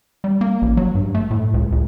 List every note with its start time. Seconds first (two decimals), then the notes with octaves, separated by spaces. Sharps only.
0.24 G3
0.41 A#3
0.62 A1
0.77 F#3
0.95 G2
1.15 A3
1.31 A2
1.54 C#2
1.72 C#2